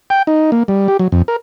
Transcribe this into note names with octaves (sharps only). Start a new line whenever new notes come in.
G5
D#4
A#3
G3
G4
F#3
F2
A#4